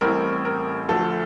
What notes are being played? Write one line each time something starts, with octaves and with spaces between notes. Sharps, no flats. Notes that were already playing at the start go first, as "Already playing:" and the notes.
A1 A2 G3 C4 E4 A#4
A#4
D2 D3 F3 A3 A4